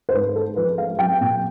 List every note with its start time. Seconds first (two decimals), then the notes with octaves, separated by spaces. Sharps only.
0.09 C5
0.13 G#2 B4
0.35 G#3 A4
0.56 F3 B4
0.78 G#3 F5
0.99 F#3 G5
1.21 A#2